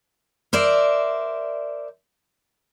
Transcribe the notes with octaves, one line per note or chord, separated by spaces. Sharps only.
A#4 C5 D5 E5